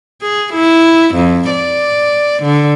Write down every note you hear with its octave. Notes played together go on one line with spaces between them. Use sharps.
G#4
E4
F2
D5
D3